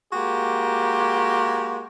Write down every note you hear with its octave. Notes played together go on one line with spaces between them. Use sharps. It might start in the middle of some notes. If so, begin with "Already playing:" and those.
G#3 A#3 F#4 G4